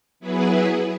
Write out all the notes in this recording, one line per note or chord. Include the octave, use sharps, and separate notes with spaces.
F#3 B3 E4 G#4 B4